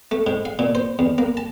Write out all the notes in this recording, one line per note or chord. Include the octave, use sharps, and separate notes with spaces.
A3
G#2
F5
A#2
C5
E2
A#3
A5